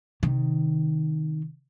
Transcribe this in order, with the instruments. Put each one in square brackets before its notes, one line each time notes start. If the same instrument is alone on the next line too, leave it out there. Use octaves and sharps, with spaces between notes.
[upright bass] C3 D#3